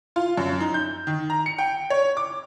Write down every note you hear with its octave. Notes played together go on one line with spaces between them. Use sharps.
F4
F#2
D#4
G6
D#3
A#5
C#7
G5
C#5
D6